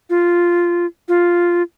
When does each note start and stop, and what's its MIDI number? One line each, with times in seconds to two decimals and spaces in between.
0.10 0.86 65
1.08 1.62 65